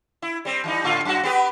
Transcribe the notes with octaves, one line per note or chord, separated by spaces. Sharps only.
E4
G3 C4
E3 G3 D#4
A2 D3 F4
F#2 D#4 F#4
B3 G4 B4